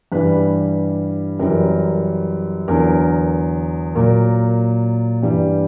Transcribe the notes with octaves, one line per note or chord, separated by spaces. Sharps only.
G2 E3 G3 B4
F#2 E3 G3 A#4
E2 D3 F#3 A#4
A#2 F#3 A#4
G2 E3 G3